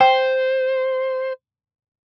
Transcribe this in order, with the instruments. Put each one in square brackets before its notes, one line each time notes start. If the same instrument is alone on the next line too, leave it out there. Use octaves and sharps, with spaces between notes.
[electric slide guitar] C5 [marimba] G5